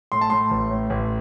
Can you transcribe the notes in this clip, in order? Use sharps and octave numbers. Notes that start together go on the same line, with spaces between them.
A2 C6
A5
A2 C6
A1
A2
A1